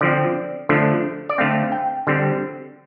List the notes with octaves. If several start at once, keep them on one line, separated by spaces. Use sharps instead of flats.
D3 F3 C4 D5
D3 F3 A3 D4
D5
D3 A3 C4 F5
G5
D3 G3 C4